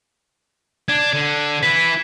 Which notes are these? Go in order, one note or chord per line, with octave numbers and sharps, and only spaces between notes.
D4 G#6
D3
E4 B4 B6 E7